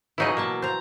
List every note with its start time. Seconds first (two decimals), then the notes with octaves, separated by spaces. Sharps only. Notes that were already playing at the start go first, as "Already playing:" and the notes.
0.18 C#3 E3 F#3 D#4 E4 D#5
0.37 B2 A#3 E5 A5
0.62 C5 A#5